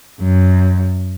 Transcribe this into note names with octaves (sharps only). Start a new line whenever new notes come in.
F#2